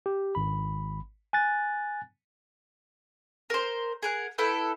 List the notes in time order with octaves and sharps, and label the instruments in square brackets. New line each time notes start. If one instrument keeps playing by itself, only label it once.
[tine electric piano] G4
G#1 B5
G#5 F#6 A6
[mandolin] A#4 C5
G#4 A#4 F#5
E4 A4 B4 G5